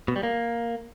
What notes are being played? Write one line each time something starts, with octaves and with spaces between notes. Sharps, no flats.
B2
G3
A#3